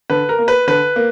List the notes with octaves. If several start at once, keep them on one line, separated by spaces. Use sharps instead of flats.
D3 B4
A#4
A#3
B4
D3 B4
A#3